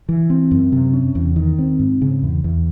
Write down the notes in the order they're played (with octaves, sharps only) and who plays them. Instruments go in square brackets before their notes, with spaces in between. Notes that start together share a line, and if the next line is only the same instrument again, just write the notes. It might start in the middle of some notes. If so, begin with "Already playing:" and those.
[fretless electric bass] E3
C4
F#2
C3
C#4
E2
D#3
C4
G#2
C#3
E2
E2